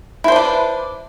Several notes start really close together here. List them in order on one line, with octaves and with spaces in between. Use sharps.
E4 C5 D4 B4